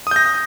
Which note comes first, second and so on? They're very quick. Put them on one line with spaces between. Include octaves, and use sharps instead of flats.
D#6 G6 A#6